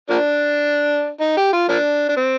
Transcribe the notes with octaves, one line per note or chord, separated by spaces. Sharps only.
F3 A#3 D4
D#4
G4
F4
F3 A#3 D4
D4
C4